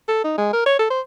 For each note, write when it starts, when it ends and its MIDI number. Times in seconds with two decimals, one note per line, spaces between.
0.08 0.23 69
0.24 0.37 63
0.38 0.50 56
0.53 0.65 70
0.66 0.78 73
0.79 0.88 69
0.90 1.01 72